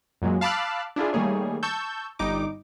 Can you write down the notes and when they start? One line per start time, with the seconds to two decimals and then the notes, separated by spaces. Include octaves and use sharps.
0.22 F#2 A#2 F#3 G#3
0.41 F5 A5 B5 D6 E6 F#6
0.96 D4 E4 F4 G#4
1.13 D#3 G3 A3 A#3 G#4 C#5
1.63 A5 C#6 E6 G6
2.19 G1 G3 D#4 D6